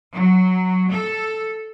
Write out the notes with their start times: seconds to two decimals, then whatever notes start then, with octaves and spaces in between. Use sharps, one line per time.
0.13 F#3
0.91 A4